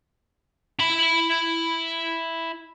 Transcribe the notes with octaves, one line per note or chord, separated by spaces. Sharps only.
E4 B5